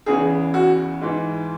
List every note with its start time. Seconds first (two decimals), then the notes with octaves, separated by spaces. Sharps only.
0.06 E2 C#3 E3 G#4
0.54 F#4
1.01 G#2 E3